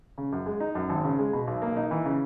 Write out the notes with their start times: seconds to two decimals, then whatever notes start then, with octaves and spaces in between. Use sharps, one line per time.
0.18 C#3
0.32 F#2
0.46 G#3
0.60 D#4
0.75 F#2
0.89 G#1
1.04 C#3
1.19 G#3
1.33 B2
1.47 B1
1.62 A#3
1.76 D#4
1.91 E3
2.05 C#3